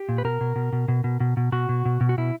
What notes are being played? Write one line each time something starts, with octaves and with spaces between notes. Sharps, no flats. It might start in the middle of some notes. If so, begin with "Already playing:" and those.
Already playing: G4
A#2
B4
B2 A#4
B2
B2
B2
B2
B2
B2
B2
B2 F#4
B2
B2
B2
F#4
B2 E4